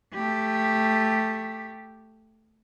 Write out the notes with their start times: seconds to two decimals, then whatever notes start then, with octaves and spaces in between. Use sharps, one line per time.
0.14 A3 G4